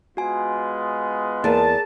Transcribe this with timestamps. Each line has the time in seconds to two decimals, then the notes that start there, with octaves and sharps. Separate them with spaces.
0.17 G#3 B3 F4 F#4 G#5
1.44 E2 A#3 G#4 A#4 A5